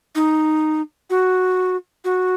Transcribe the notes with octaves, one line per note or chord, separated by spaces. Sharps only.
D#4
F#4
F#4